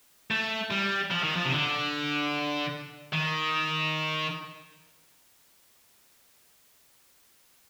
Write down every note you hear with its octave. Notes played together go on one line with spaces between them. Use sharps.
A3
G3
F3
D#3
F3
C3
D3
D#3